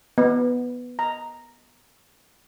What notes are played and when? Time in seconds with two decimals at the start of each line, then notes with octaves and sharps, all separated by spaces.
0.18 B3
0.99 A#5